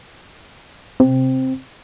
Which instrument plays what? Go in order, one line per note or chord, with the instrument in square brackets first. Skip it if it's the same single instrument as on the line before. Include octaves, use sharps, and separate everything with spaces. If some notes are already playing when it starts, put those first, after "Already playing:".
[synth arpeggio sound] C3 [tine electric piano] C4